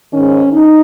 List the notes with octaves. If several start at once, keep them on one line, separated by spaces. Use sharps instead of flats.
G#2 D#3 C#4
D#4